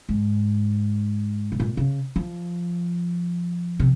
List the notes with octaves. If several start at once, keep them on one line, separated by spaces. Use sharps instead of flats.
G#2
C3
A#2
C#3
F3
C3